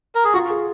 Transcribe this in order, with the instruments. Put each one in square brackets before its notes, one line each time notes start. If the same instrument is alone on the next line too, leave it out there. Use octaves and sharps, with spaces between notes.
[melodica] A#4
G#4
[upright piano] F4 [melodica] F#4
[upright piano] G#4